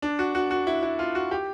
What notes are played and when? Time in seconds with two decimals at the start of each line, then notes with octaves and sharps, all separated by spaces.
0.02 D4
0.19 F#4
0.35 F#4
0.51 F#4
0.67 E4
0.83 E4
0.99 F4
1.15 F#4
1.31 G4